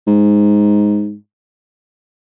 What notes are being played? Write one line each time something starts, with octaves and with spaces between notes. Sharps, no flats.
G#2